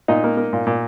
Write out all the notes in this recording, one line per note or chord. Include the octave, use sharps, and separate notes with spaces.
A#2 D#4 D#5
A#3
A#3
A#2
A#2